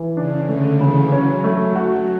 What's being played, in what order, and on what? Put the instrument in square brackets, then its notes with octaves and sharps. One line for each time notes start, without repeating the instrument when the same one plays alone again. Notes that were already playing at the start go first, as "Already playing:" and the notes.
Already playing: [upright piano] E3
[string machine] C#3 [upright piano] D4
[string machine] D3 [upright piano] A3
[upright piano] C#3 [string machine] E3
[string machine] F#3 [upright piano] C#4
[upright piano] A3
F#4